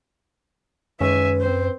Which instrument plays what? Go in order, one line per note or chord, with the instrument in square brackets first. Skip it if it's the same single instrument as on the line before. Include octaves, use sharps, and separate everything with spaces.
[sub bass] F#2 [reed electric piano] D#3 G#3 C#4 [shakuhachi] B4 [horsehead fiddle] E5 G#5
[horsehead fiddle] C4 C5